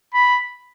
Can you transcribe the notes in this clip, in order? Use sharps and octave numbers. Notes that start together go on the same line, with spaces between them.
B5